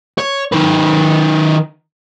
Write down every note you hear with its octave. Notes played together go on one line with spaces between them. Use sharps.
C#5
D#3 B4